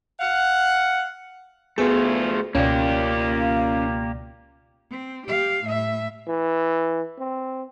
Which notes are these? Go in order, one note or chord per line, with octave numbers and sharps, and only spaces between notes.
F5 F#5
D2 A3 B3 F4 G#4
C#2 B2 A#3 C#4 F4 G4 D5
C4
G4 F5
A2 E5
E3
C4